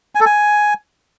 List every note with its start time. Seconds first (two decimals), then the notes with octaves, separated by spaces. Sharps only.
0.15 G#5
0.20 A4
0.26 G#5